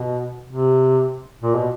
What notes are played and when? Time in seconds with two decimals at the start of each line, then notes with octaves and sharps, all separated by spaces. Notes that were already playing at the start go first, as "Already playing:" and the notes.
Already playing: B2
0.50 C3
1.42 A#2
1.55 B2